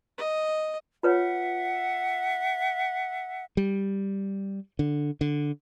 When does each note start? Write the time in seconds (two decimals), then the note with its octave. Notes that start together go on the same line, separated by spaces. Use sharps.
0.18 D#5
1.03 F4 B4 C#5 E5 F#5
3.57 G3
4.79 D3
5.21 D3